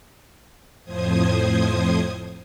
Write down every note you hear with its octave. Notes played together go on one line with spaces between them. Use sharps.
F2 A2 F3 C5 D#6 G#6